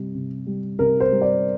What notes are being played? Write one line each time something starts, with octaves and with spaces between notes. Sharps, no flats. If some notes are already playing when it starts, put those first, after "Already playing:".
Already playing: C3 G3
C3
G3
C3 A#4
C5
G3
D5